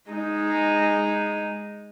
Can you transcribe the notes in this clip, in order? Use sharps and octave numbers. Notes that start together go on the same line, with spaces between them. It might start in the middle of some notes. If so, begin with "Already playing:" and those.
G#3 D#4